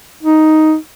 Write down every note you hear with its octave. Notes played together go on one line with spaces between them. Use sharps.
D#4